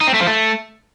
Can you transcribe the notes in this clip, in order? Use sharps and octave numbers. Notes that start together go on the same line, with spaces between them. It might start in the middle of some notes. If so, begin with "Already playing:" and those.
D#4
C4
A3
F3
A3